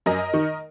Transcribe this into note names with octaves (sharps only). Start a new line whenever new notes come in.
F#2 A#4 D#5
D#3